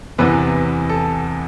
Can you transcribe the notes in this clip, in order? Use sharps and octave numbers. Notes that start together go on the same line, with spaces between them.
E2 C3 E3 B3 B4
A4